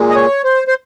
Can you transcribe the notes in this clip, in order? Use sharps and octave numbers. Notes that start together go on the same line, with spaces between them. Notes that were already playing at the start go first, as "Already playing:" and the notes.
Already playing: A#2 G#3
D#5
C#5
C5
C5